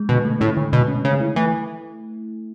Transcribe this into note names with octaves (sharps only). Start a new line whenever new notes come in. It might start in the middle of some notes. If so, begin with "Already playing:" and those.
Already playing: G#3
B2 D3
A3
A2 C#4
D3
B2 D3
C#4
C#3 C#4
E4
E3 A3